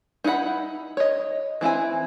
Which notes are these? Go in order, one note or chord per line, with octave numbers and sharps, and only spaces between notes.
D#4 E4 G#4 F#5 B5
C#5 D#5
E3 C4 E4 G#5